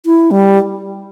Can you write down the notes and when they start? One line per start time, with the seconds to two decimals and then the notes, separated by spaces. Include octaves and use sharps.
0.06 E4
0.31 G3